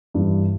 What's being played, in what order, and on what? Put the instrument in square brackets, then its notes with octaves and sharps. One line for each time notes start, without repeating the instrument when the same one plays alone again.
[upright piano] G2 E3 G3